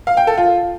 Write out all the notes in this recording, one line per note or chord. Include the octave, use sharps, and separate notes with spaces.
F5
G5
A4
F4